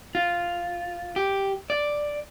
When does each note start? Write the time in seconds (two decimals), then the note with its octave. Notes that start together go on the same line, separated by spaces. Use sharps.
0.15 F4
1.16 G4
1.70 D5